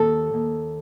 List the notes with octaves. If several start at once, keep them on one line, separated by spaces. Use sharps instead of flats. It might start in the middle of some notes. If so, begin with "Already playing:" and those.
Already playing: D#2 A4
D#2